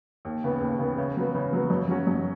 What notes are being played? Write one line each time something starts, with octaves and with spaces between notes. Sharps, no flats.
D#2
C#3 B3
D#2
C#3 B3
C#3
F#3 B3
C#3
F#3 B3
F#2
F#3 C#4 F#4
F#2